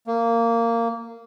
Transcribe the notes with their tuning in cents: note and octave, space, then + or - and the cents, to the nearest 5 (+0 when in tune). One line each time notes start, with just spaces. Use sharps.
A#3 -15